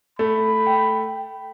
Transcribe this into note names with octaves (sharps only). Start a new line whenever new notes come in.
A3 B5
G5